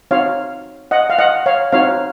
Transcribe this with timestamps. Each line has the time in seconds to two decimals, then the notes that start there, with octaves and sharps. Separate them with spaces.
0.11 C4 D#4 F#4 C#5 F5
0.91 D#5 F#5
1.10 F5
1.19 D#5 F#5
1.46 C#5 F5
1.72 C4 D#4 F#4 C#5 F5